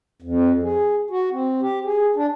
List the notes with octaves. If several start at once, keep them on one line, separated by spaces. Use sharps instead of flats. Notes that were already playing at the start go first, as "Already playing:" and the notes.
F2
G#4
F#4
C4
G4
G#4
D4